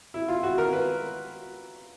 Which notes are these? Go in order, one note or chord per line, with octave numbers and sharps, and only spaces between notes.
E4
F4
F#4
A#4
B4